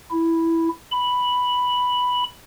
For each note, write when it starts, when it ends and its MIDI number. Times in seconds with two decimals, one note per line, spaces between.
0.11 0.68 64
0.92 2.24 83